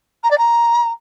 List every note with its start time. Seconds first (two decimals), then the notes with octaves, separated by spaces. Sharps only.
0.23 A#5
0.30 D5
0.38 A#5